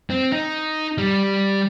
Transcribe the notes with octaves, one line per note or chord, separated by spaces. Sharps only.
C4
D#4
G3